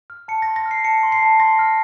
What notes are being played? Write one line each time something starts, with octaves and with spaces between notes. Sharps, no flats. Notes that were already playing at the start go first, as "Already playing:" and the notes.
F6
A5 C#7
C6 A#6
A#6
F6
C7
A5 C#7
C6
C7
A5
C6 A#6
F6